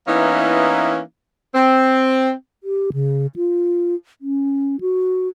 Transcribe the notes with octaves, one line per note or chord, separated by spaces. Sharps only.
E3 A#3 B3 C#4 D#4 E4
C4
G4
C#3
F4
C#4
F#4